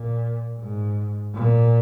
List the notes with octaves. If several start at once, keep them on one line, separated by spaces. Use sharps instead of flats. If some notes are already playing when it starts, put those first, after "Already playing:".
Already playing: A#2
G#2
A#2